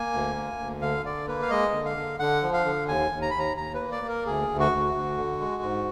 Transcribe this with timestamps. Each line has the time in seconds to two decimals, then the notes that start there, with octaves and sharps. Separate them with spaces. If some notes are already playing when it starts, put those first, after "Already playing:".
Already playing: A#3 G#5
0.13 D2
0.36 A#3
0.59 D2
0.82 D3 F5
1.05 D3 D5
1.28 A#3 B4
1.42 F5
1.50 G#3 D#5
1.73 D3
1.85 F5
1.97 D3
2.19 D3 F#5
2.43 F3
2.54 F5
2.65 D3
2.88 D#2 G#5
3.11 D#2
3.22 A#5
3.30 B5
3.34 D#2 A#5
3.57 D#2 A#5
3.74 B4
3.80 A#3
3.92 D5
4.03 A#3
4.08 A#4
4.25 D2 G#4
4.49 D2
4.60 F#4
4.72 D2
4.94 D2
5.18 D3
5.40 G#3
5.62 G#2